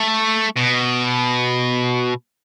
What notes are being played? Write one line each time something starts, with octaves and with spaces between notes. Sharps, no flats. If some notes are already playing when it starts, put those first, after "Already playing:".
Already playing: A3
B2